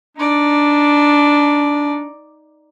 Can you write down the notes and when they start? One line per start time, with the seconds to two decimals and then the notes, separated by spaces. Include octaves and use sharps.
0.17 D4 D#4 D5